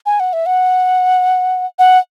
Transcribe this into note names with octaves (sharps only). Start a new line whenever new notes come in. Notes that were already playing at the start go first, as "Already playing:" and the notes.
G#5
F#5
E5
F#5
F#5